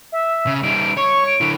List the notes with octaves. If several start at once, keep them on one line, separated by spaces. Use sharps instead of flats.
E5
C#3
G3 D#4 D7
C#5 C#6
D7
D3 E4